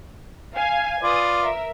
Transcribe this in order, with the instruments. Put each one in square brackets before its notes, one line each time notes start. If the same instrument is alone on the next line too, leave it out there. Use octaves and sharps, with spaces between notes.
[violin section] F5 G#5
[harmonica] F4 D5 [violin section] B4 D#6
[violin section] A#4 E5